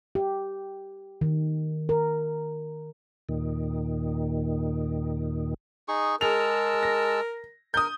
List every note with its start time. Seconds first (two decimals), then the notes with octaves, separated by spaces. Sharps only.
0.15 G4
1.21 D#3
1.89 A#4
3.29 D#2 A#2 D#3
5.88 D#4 G#4 C#6
6.21 G#3 G#4 A#4 A5 E6 F7
6.83 A#6
7.74 A#4 D#6 G6